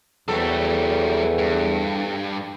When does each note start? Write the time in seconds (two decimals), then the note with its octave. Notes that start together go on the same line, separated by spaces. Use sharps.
0.28 E2 F#3 G3 A3 C4 A4
1.39 G2